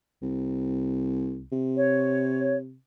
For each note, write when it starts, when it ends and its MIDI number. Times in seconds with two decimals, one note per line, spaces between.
0.22 1.44 36
1.52 2.76 48
1.77 2.56 73